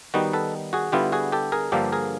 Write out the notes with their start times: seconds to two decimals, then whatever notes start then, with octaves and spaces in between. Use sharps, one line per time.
0.14 D#3 G3 B3 D#4 F#4
0.33 A4 B4
0.73 F#4 G#4
0.92 D3 G3 B3 E4 F4 G4
1.12 F#4 G#4
1.32 G4 A4
1.52 G#4 A#4
1.72 G2 D3 F3 A#3 G4 A4
1.92 G#4 A#4